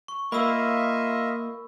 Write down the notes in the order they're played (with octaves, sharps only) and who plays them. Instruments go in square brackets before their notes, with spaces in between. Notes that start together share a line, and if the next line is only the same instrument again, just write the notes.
[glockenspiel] C#6
[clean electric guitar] A#3 [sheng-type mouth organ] F4 D#5 E5 [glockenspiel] B5 E6